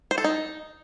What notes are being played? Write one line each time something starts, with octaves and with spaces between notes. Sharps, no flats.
C5
A4
D#4